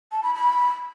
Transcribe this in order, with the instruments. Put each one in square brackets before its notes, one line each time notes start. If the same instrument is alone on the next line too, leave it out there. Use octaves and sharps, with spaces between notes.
[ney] A5
B5
B5